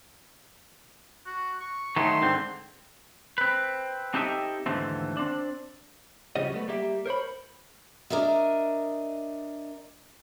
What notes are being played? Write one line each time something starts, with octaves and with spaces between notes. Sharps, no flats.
F#4
C#6
D#3 F#3 A3 C6
G#2 D3 C4
C4 B4
C4 D#4 G4 A4 D#5 E5
D#2 G#2 D3 E3 A3 C4
C4 D4
C#2 C#3 F3 G3 F#4 D#5
F#3 A3 B3
G3 A#3 G4 E5
A#4 C5 C#5 B5
D4 A#4 D#5 E5